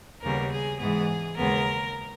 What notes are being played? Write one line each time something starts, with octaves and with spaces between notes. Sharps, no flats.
D#2 C#3 G3 B3 A#4
G#4
G#2 E3 G#3 B3 G#4
D#2 C#3 G#3 B3 A#4